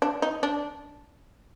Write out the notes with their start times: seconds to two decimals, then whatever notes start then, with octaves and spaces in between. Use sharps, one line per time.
0.02 D4
0.22 D#4
0.43 D4